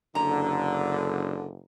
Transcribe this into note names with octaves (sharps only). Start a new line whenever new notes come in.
F#1 D3 A#5